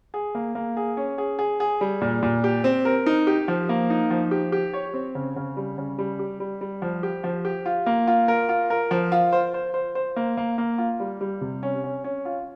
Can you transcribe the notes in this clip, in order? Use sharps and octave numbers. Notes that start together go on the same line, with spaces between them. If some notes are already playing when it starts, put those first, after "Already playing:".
G#4
A#3
A#3
G#4
C#4
G#4
G#4
G#4
G3
A#2
A#2
G4
C4
A#4
D#4
G4
F3
A#3
D#4
F3
G4
G4
C#5
C4
C#3
C#3
G3
C#3
G3
G4
G3
G3
F3
G4
F3
G4
F4
A#3
F4
A#4
F4
A#4
F3
F4
C5
C5
C5
C5
A#3
A#3
A#3
F4
G3
G3
C3
C#4
C#4
C#4
F4